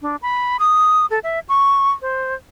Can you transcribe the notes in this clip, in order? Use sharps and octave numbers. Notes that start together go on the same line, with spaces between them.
D4
B5
D#6
A4
E5
C#6
C5